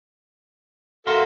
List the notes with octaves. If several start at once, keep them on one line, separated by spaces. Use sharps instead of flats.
F#4 A4 A#4 E5 F5 C6